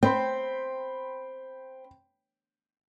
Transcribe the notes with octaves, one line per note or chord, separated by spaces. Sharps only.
C4 G5 B5 C6